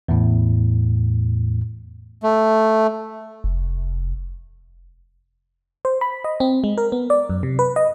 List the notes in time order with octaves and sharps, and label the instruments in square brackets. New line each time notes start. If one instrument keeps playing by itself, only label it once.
[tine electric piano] E2 A2
[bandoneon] A3
[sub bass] F1
[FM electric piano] C5
B5
D#5
C4
G#3
A#4
B3
D5
F#2
C3
B4
D#5